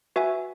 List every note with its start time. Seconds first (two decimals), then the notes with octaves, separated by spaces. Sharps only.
0.16 F#4 B4 E5 G#5